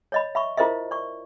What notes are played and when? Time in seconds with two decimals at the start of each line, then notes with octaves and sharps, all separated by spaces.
0.12 C#5 D#5 B5
0.35 E5 B5 C#6
0.58 E4 F4 A#4 C5 D#5 E5
0.91 D5 C#6